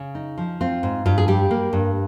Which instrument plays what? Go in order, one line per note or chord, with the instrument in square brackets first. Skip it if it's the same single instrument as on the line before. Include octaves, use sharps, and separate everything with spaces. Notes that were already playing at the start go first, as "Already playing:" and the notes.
Already playing: [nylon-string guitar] C#3
D#4
F3
C4 F4
G#2
G2 F4
G#4
G3 G4
A#3
G2